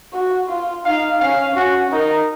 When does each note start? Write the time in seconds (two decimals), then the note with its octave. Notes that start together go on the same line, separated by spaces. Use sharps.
0.13 F#4
0.49 F4
0.85 D#4 F5
1.20 C#4 F5
1.55 C#4 F#4
1.92 D#4 A#4